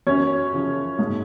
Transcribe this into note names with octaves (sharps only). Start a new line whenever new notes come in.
F#2 C#4 C#5
C#3 F3
G#2